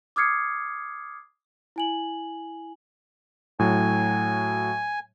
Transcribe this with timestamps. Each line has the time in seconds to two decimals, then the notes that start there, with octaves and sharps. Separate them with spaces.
0.16 D6 D#6 F6 G#6 C7 C#7
1.76 E4 G#5 F#7
3.59 A2 F#3 G#5